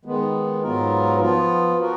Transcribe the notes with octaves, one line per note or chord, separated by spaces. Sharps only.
D#3 G#3 B3
G#2 F#3 B3 F4 A#4
F3 B3 F4
F3 B3 F#4 A#4